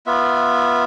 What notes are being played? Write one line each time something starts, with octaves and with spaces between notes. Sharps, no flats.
B3 F4 E5